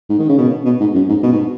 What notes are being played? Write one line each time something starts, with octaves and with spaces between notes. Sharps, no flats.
G#2
D#3
C#3
B2
B2
G#2
F#2
G#2
B2
G#2